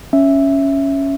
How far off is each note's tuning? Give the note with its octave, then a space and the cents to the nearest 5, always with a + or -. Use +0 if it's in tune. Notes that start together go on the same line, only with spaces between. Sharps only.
C#4 +0 E5 +0